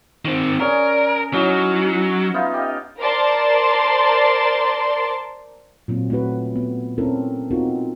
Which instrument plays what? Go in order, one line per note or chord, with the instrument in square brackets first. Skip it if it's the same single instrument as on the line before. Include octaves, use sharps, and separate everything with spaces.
[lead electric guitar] D#3 C4 [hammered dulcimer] C#6
[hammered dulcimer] C#4 G#4 [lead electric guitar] A#4 [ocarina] D5
[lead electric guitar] F#3 [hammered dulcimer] C#4 D#4 F#4 [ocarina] E4
[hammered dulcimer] B3 D#4 F4 [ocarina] E5
[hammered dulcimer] G4 D#5 F5
[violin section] A#4 C5 D5 A5 C6
[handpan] A#2 F#3 C4 F4
A3 C4 E4 F#4 B4
B3
C4 C#4 E4 A4 A#4
B3 C4 D#4 F4 F#4 A#4